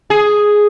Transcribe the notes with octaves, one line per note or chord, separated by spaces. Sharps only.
G#4